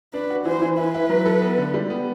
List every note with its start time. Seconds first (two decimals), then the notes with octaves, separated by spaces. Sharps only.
0.14 D4 B4
0.30 F#4
0.45 E3 C5
0.62 E3
0.77 E4 B4
0.95 E4
1.09 F#3
1.26 A4
1.42 B3
1.58 D3
1.74 G3
1.90 B3